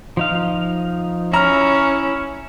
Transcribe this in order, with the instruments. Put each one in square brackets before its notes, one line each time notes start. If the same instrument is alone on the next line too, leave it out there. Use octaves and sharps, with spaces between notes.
[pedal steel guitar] F3 D#4 F5
[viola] C#4 [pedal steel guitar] E4 F6 [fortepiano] A#5